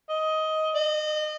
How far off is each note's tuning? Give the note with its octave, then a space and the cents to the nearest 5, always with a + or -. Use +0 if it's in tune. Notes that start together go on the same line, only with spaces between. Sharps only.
D#5 +15
D#5 -30